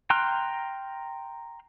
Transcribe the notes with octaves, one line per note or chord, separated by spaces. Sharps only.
G5 A#5 C6 F6 F#6